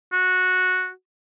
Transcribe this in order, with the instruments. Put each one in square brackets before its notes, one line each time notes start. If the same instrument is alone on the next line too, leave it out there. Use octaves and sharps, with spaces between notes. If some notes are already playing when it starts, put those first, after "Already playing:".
[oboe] F#4